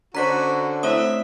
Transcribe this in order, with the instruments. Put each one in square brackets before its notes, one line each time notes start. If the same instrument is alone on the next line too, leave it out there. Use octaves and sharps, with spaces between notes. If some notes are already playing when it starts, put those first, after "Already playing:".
[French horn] D3 [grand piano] C#4 D4 C5 [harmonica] F#4 [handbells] A#5 B6
[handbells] A3 C#5 D#6 [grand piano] C4 E4 [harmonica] E5